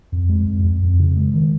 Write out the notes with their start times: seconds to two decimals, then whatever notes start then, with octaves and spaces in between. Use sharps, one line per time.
0.12 F2
0.29 G#3
0.47 F2
0.64 F2
0.82 F2
0.99 C#3
1.16 G#3
1.34 D#3